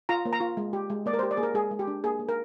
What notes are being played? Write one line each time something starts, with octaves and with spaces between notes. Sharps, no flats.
F4 A#5
A#3
A#5
F4
G#3
G4
G#3
A#3 D5
A#4
G4 C5
D5
A#3 G#4
A#4
G#3 G#4
G#3
G4
D4
A#3 G#4
A#3
A#4